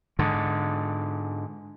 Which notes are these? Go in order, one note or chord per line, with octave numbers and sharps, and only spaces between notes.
G#2 D3